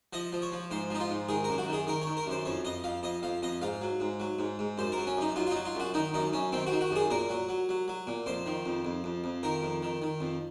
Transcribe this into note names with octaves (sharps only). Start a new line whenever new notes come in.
F3 D#5
F3
C#5
F3
G#2 C5
F3 D#4
F4
G#2
D#3 G#4
F#2 A#4
F#4
D#3 G#4
D#3 A#4
C#5
D#3
A#4
F#2 C5
F2 C#5
F2 D#5
F2 F5
F2 D#5
F2 F5
F2 D#5
G#2 F5
F#3
G#2
F#3
G#2
G#2
F#2 C5
A#4
F#3
C#4
F#2 D#4
F#3 F4
F4
F#3 D#4
F4
F#2 F#4
D#3 D#4
F#2 D#4
F#2 C#4
D#3 C4
F#4
D#3
F#4
F#2 G#4
A#2 A#4
F#3
F#3
F#3
F#3
A#2
F2 C5
D#3
F2
F2
F2
F2
D#3 A#4
F2
D#3
D#3
F2